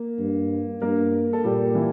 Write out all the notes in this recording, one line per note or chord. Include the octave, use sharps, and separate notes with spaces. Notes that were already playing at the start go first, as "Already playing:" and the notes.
Already playing: A#3
G2
G2 A#3 A#4
A4
A#2 G3 G4
E3 E4